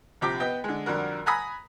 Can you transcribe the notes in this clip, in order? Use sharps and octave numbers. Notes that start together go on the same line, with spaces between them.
A#1 C3 F3 G4 A#5 D6
B3 D#5 G5
D3 G#3
F2 D3 G3 F#4 A#4
F#5 G#5 A#5 B5 D#6